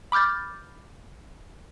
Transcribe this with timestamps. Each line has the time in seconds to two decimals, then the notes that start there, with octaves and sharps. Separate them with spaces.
0.12 B5 D6 F6 G6 A6